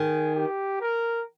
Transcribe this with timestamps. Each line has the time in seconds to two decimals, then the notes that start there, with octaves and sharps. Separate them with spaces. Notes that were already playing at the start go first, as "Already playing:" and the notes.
Already playing: D#3 G#4
0.36 G4
0.81 A#4